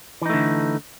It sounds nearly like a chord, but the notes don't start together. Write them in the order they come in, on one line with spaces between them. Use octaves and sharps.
E3 D#4 A3 D3